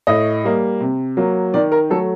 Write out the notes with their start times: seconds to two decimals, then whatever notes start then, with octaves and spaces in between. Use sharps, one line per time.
0.07 A2 D#5
0.45 G3 A#3
0.81 C3
1.17 F#3 A#3
1.54 D#3 D5
1.72 A#4
1.90 F#3 A3 A4